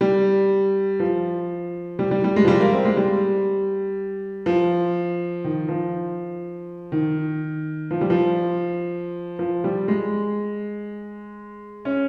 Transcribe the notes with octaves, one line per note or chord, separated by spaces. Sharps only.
G3
F3
G3
G3
G3
G#3
F3
G3
A#3
C4
G#3
G3
F3
D#3
F3
D#3
F3
G3
F3
F3
G3
G#3
C#4